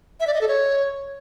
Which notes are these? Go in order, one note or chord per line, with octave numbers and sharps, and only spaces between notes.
E5
D5
D#5
A4
C#5